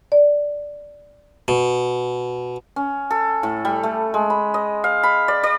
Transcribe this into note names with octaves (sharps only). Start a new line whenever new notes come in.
D5
B2
C#4
A4
A2
G3
A3
G#3
B5
D#5
F5
B5
D5
D5